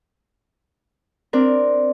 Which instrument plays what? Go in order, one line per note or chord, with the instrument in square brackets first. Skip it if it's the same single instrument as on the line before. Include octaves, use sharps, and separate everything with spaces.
[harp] C4 D4 A#4